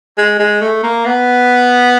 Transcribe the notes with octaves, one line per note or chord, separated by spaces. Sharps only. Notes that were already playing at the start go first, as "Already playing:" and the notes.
G#3
G#3
A3
A#3
B3